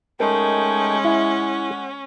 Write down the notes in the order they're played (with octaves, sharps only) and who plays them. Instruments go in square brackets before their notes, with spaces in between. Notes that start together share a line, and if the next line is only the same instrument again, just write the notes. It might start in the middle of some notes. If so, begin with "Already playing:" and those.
[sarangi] G#3 [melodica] A3 D#4 G5 [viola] C#4 [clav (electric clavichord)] A#4
[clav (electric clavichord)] E4 [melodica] F#5